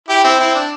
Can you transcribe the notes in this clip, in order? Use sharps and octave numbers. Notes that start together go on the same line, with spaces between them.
E4 G4
C4 E4
C4 E4
D4